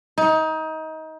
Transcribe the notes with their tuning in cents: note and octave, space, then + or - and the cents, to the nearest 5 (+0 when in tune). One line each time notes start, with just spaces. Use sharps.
D#4 +25